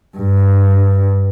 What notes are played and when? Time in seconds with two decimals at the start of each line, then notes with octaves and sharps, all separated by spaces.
0.17 G2